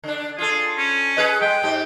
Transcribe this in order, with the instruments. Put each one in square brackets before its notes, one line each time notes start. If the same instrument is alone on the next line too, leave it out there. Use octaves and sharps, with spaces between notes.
[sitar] D3 D4
[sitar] F4 A4 [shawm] G#4
[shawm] C#4
[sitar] G#4 B4 D#5
[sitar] G#3 [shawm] G5
[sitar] G#2 G4